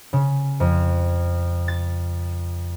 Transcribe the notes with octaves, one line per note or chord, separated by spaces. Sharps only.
C#3
F2
A6